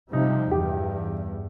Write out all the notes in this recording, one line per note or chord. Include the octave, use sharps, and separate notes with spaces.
C3 F3 G3 D#4
E2 G2 G4